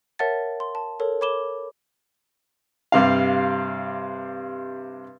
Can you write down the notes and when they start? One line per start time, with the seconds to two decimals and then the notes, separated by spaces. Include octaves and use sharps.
0.19 A#4 C#5 E5 F#5 A5 A6
0.60 C6
0.75 A5
1.00 A4 A#4 C#5
1.21 C#5 B5 D6 E7 G7
2.92 G2 C3 F5